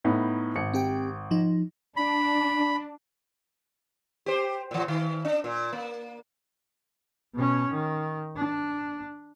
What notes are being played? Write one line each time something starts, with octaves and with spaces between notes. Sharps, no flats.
A2 B3 D#4
G#1 C#7
C4 G4 G5
F3 D#4
D4 B5
G4 C5
A#2 E3
D#3
D4
A#2
A#3
B2 C#4
D#3
D4